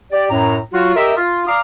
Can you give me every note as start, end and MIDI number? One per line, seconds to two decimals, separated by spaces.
0.12 0.26 67
0.12 0.26 74
0.30 0.57 42
0.30 0.57 45
0.30 0.57 82
0.72 0.93 54
0.72 0.93 65
0.72 0.93 66
0.96 1.12 67
0.96 1.12 70
0.96 1.12 75
0.96 1.12 76
1.17 1.44 65
1.46 1.60 74
1.46 1.60 77
1.46 1.60 82
1.46 1.60 86
1.46 1.60 87
1.46 1.60 89